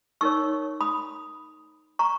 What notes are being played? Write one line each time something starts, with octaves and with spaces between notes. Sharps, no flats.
D#4 A#4 C#5 C#6 E6
B5 D#6
A#5 C#6